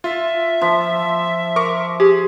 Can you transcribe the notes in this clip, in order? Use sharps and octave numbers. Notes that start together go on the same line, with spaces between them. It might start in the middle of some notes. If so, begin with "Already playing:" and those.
F4 E5
F3
A#4 C#6 D6
G4 G#4